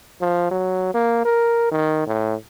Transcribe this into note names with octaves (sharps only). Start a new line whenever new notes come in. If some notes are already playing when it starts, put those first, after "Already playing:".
F3
F#3
A#3
A#4
D#3
A2